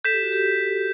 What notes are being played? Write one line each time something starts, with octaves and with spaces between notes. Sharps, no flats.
A4 G6 B6 E7
G4
F#4
G4